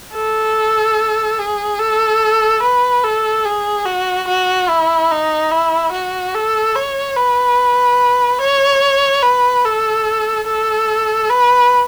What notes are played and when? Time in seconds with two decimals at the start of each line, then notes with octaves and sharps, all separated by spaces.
0.14 A4
1.39 G#4
1.79 A4
2.63 B4
3.04 A4
3.45 G#4
3.86 F#4
4.28 F#4
4.69 E4
5.11 D#4
5.51 E4
5.92 F#4
6.34 A4
6.76 C#5
7.17 B4
8.41 C#5
9.23 B4
9.65 A4
10.47 A4
11.30 B4